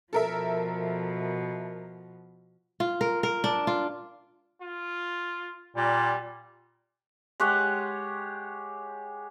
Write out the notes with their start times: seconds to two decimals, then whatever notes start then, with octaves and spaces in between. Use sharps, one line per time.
0.13 B2 F3 A4 A#4 E5
2.80 F4
3.01 A#4
3.23 A#4
3.44 D4
3.67 F4
4.62 F4
5.76 A#2 G3
7.40 G#3 G4 C#5 F#5